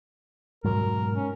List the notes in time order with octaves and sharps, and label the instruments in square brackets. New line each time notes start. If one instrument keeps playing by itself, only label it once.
[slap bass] G#2 B2 F#3 [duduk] A#4
[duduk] C#4